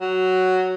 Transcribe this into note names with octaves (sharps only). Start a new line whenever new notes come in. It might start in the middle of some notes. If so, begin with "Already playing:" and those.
F#3